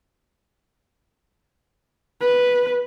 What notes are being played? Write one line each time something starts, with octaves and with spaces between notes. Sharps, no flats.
B4